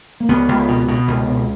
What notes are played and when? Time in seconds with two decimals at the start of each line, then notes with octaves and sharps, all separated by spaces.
0.20 A#3
0.28 C#2 B3
0.48 C#2
0.68 B2
0.88 B2
1.08 C#2
1.27 B2